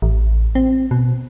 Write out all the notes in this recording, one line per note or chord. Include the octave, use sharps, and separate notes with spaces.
A1
C4
B2